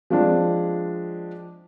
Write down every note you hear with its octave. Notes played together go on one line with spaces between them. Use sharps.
F3 G#3 C4 D4